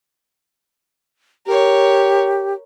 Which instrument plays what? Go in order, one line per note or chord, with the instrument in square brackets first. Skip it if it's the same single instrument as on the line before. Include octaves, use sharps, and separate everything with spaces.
[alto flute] G4 [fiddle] A#4 C#5